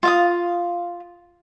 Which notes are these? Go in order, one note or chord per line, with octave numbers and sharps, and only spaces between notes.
F4 F5 D#6